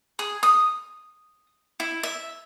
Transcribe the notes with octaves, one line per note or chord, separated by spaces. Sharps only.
G#4
D#6
E4
E5